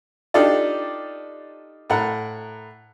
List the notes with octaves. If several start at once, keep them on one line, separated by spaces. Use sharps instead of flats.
D4 D#4 F4 G4 A4 D5
A2 A#4 F#5